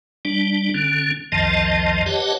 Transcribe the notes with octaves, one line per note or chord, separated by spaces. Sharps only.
G3 D4
D3 C#4
C2 F2 D#3 F3 D#5 A5
G4 B4 C#5 D#5 F#5 A5